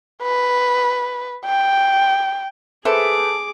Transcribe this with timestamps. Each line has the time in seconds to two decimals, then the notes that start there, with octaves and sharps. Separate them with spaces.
0.23 B4
1.46 G5
2.85 G#4 A4 B4 C5 E5 D6